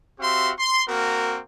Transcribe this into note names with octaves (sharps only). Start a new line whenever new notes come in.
C4 F#4 G4 E5 F5 C6
C6
A#3 C4 F#4 A#4